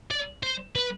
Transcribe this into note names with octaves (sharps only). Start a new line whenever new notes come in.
D5
C5
B4